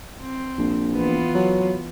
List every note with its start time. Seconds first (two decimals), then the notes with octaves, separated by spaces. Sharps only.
0.20 C4
0.58 A#1
0.92 E3 B3 F4
1.35 F#3